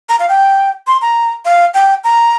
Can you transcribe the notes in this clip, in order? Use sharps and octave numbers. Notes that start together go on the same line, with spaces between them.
A#5
F5
G5
C6
A#5
F5
G5
A#5